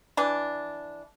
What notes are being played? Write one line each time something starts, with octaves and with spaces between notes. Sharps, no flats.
E3 D4